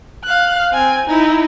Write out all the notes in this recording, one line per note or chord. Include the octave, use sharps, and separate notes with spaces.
F5 F#6
C4 G#5
D#4 E4